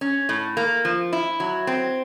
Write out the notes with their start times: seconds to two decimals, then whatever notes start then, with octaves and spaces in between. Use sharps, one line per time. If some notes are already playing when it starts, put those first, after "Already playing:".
0.01 C#4
0.29 A2
0.57 A#3
0.85 F3
1.13 E4
1.40 F#3
1.67 C4